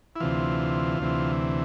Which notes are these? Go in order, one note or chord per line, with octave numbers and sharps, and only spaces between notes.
E4
D2 C3 E3 F4
D2 C3 E3